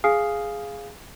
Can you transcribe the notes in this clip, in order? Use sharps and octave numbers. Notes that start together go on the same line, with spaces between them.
G#4 F5 G#5 D#6 F6 C7